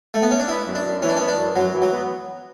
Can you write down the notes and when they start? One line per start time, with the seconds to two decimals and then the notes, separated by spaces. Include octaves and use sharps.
0.14 A3
0.22 B3
0.31 C#4
0.40 D4
0.48 B3 E4
0.66 F#2
0.75 D4
0.85 F#2
1.02 E3 C#4
1.09 D4
1.16 B3 C#4
1.28 D4
1.37 F#2
1.55 F#2 F#3
1.72 E3
1.82 F#3
1.91 B3